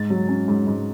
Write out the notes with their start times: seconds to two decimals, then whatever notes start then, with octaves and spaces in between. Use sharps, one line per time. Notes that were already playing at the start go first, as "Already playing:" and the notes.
Already playing: G#2 A6
0.10 F#3
0.29 C#4
0.48 G#2
0.67 G#2